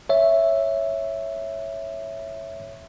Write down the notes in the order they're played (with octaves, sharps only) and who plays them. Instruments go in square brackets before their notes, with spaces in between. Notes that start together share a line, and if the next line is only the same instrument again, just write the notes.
[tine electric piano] C#5 E5